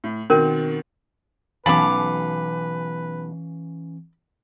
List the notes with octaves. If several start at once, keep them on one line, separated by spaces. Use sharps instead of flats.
A2
B2 D#3 C4 C#4 A#4
B1 E3 C#4 B4 F5 A5 B5 D6